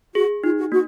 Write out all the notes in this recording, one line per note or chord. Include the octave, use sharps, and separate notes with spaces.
F#4 G#4
D#4 F4
F#4
A#3 F#4